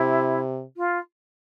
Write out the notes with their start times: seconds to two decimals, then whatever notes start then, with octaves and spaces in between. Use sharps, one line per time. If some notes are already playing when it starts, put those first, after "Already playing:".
Already playing: C3 E4
0.77 F4